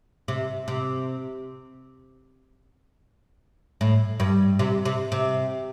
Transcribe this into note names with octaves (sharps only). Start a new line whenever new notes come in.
C3
C3
A2
G2
C3
C3
C3